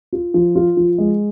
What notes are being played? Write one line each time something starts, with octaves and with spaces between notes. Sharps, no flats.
F4
F3
F4
F3
G#3